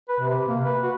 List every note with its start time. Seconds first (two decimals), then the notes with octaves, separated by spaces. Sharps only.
0.09 B4
0.20 C3
0.48 A#3
0.64 B4
0.83 F#4